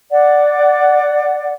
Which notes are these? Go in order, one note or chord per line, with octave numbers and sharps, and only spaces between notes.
D5 F#5